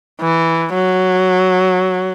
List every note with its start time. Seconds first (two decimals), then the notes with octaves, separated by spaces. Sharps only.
0.21 E3
0.74 F#3